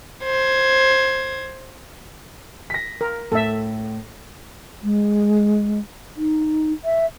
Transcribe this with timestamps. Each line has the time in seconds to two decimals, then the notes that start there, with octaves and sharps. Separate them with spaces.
0.24 C5 G#6
2.70 A#6 B6
3.01 A#4
3.32 A2 A4 E5
4.83 G#3
6.17 D#4
6.85 E5